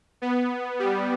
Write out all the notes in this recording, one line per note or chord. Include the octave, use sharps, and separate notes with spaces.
B3
G3